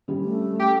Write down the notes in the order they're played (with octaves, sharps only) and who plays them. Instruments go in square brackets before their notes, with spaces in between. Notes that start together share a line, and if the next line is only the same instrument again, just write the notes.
[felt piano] G3 C#4
[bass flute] A3
[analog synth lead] G4